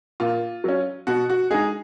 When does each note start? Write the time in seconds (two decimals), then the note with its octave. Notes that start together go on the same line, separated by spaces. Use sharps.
0.20 A#2 F4
0.64 F#3 C#4
1.07 B2 F#4
1.30 F#4
1.50 G#3 D#4 G#4